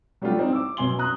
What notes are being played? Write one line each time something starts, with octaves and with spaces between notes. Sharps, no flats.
F#3 G3 A3 D4 F4 G4
C4 D#4 E4
D6 E6
F#2 B2 G#5 C6 G7
A#5 D#6 F#6